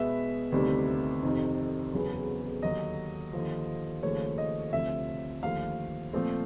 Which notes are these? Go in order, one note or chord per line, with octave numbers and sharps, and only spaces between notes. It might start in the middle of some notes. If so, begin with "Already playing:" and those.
Already playing: B2 G#3 B3 E5
D2 C3 D#3 G3 B3
F2 C3 D#3
E2 C#3 F#3 B3
D#2 D3 F#3 D#5
D#2 D3 F3
D#2 C#3 F3 A3 C#5
D#5
D2 C3 F3 E5
D#2 D3 F3 A3 F5
A#2 F3 A3 C4